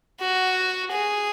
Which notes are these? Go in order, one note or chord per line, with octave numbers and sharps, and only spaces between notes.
F#4
G#4